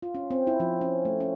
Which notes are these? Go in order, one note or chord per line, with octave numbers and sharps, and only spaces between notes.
F4
C#4
C4
E4
F3
C#4
A3
C#4